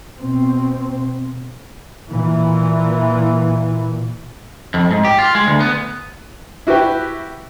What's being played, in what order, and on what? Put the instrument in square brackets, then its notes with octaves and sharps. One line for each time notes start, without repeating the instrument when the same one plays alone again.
[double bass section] B2 C4
A#2 E3
[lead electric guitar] F2
G#2
G4
F4
G#3
D2
B3
[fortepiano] E4 F#4 G4 B4 G5